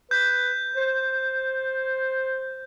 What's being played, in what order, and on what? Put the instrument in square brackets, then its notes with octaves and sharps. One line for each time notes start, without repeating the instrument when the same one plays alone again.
[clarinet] B4 [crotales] G6
[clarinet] C5